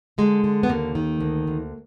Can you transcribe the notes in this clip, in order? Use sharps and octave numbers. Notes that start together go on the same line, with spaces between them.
D3 G#3
D3
B3
D#2 A#3
D#3
D2
D2